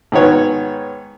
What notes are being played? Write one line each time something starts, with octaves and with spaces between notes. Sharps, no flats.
G#2 D#3 B3 C#5 F#5